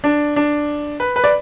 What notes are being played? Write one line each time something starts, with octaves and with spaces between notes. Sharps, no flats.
D4
D4
B4
B4
D5